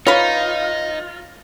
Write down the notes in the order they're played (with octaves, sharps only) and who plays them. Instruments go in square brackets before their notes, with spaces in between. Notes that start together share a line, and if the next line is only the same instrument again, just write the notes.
[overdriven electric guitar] D#4 [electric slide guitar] F4 [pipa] B4 C#5